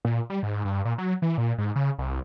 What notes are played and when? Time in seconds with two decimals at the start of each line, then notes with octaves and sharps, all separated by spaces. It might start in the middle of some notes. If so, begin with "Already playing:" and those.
0.05 A#2
0.30 G3
0.43 G#2
0.65 G2
0.85 A#2
0.98 F#3
1.22 E3
1.38 A#2
1.58 G#2
1.76 C#3
1.99 C2